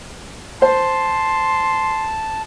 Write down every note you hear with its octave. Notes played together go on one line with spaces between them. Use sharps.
C5 A5 C6